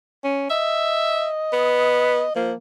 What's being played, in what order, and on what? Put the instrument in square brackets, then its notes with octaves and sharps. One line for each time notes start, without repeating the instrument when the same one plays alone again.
[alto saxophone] C#4
[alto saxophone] D#5 [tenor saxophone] E5
[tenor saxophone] B3
[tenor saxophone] F3 [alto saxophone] A#3